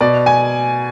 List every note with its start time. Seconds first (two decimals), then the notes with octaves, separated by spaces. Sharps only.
0.01 B2 D5
0.26 G#5